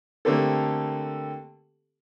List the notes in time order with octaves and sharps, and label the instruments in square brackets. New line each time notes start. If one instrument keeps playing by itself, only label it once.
[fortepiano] D3 A3 A#3 C4 G4 A4